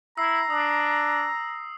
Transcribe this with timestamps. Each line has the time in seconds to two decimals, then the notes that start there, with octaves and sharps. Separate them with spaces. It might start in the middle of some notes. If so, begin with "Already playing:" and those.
0.18 E4 A#5 E6 C7
0.50 D4 D#6